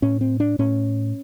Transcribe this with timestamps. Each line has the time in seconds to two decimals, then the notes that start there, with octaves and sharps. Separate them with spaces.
0.02 A2 C#4
0.21 C4
0.40 D4
0.59 A2 C#4